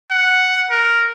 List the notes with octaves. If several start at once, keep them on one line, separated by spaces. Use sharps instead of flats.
F#5
A#4